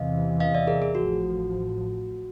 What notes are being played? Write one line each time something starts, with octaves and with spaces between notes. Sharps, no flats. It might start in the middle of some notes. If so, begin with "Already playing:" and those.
Already playing: E2 C3 E3 D#5 F5
D#5 F5
D5 E5
G#4 A#4
G#4
A1 A2 F3 F#4